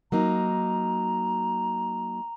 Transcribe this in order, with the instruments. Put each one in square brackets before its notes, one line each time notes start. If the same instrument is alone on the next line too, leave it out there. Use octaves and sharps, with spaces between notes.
[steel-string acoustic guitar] F#3 A#3 D#4 [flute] A#5